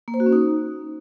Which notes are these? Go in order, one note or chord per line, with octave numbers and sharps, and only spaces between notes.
A#3
C5
F#4
C#4
D#4